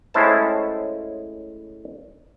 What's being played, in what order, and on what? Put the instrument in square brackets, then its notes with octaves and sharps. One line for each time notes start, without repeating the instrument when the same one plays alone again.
[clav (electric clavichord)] A2 G#3 C#4 E4 C5 A5